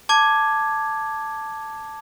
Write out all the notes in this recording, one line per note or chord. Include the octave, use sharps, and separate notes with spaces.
A5 D6 G#6